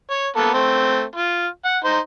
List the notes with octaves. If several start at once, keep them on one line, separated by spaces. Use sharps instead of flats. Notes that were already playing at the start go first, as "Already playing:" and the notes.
C#5
A#3 B3 A4
A3 C4
F4
F#5
D#4 C5